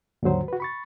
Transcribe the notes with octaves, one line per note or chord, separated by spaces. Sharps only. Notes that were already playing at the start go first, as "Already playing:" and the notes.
D#2 G#2 D3 F#3 C5
F#4 B4
B5 C#6 A6